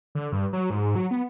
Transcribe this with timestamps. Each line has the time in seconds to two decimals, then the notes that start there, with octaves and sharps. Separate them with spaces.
0.15 D3
0.32 G2
0.53 F#3
0.70 G#2
0.95 F#3
1.11 B3